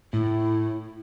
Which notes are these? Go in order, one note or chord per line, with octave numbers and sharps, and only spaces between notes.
A2 E4